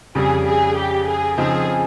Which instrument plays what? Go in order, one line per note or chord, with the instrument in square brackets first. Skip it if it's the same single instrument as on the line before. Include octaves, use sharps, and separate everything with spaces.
[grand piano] F2 C#3 G3 [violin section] G#4
[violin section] G#4
G4
G#4
[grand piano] C#3 F3 C4 D#4 [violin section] G#4